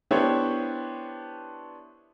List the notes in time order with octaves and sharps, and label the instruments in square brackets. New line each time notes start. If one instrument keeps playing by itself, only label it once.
[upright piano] B3 D4 E4 G4 C5 C#5